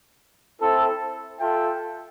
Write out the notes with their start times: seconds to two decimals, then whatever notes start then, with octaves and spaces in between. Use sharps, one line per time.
0.61 C4 E4 A4
1.40 F4 A4 E5 G5